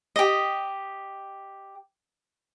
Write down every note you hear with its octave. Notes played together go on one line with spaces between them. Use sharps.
G4 D#5